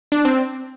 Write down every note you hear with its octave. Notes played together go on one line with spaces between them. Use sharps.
D4
C4